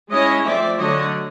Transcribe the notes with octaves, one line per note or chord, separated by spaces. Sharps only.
G#3 C#4 E4 C#5 D#5
F3 A3 C4 D5 E5
D3 F#3 A3 D4 C#5 D#5